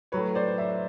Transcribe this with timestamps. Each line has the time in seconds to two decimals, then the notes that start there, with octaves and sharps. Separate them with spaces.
0.12 A2 F#3 A3 B4 C#5
0.35 C5 D5
0.58 D5 E5